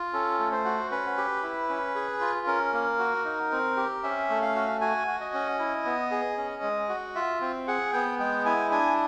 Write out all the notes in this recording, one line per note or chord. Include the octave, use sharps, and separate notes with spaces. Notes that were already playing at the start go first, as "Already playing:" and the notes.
Already playing: F4
C#4 A4
A3
C5
F#4
C#4 B4
G4
E4
C#4
G#4
F4
C#4 A#4
A#3
F#4
D#4
C4
G4
C#4 E5
A3
F5
F#4
F#4 G#5
F#4
D#5
C#4
E4
B3
G#4
C#4
G#3
F#4
F4 E5
C4
G#4 F#5
B3 G5
G#3 G5
E4 G#5
D4 G#5